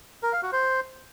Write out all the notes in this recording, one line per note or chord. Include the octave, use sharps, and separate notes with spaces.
A#4
F5
F#4
C5